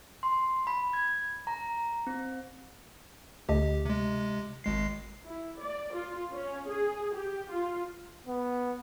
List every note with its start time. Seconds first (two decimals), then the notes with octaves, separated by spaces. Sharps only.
0.23 C6
0.67 B5
0.93 G#6
1.47 A#5
2.07 C4
3.49 D2 A3 G4 D#5
3.85 C3 G#3
4.64 G#1 G#3 C7
5.26 E4
5.60 D5
5.95 F4
6.33 C#4
6.70 G#4
7.14 G4
7.52 F4
8.27 B3